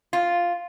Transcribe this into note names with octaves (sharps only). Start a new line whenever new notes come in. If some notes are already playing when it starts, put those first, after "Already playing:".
F4